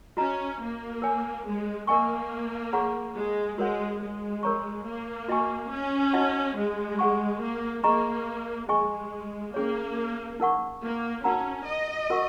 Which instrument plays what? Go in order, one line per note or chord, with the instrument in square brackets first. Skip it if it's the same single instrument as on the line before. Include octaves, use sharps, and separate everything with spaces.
[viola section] C#4 [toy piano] F#4 D#5 A#5
[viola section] A#3
[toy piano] A#4 C#5 G#5
[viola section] G#3
[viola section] A#3 [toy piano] A#4 D#5 G#5 C#6
[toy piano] G#4 C#5 F#5 A#5 C#6
[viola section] G#3
[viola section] G#3 [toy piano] F#4 A#4 C#5 F#5
[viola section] G#3
[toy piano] A#4 C#5 A#5 C#6
[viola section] A#3
[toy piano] F#4 D#5 G#5 C#6
[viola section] C#4
[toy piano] D#4 F#4 D#5 F#5
[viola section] G#3
[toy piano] G#4 F#5 C#6
[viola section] A#3
[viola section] A#3 [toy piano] G#4 D#5 A#5 C#6
[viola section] G#3 [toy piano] G#4 D#5 G#5 C#6
[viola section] A#3 [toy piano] C#4 G#4 C#5
[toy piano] D#4 A#4 F#5 C#6
[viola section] A#3
[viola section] C#4 [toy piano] D#4 F#4 A#4 F#5 A#5
[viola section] D#5
[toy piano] F#4 A#4 F#5 C#6